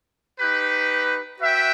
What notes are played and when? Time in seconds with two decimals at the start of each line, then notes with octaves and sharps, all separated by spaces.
0.39 D#4 G4 B4
1.39 F#4 B4 E5 G5